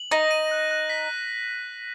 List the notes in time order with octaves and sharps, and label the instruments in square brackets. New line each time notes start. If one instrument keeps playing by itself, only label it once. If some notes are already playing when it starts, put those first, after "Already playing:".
Already playing: [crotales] F#7
[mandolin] D#4 [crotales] A#6
[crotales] D#7
F#6
F#6
B6